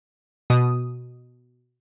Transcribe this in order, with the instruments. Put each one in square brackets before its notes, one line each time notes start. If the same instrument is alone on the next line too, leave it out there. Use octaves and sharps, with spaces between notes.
[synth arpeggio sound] B2 D#6